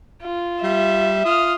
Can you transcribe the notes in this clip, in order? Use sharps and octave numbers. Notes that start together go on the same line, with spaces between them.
F4
G3 E5
F4 D#6 F6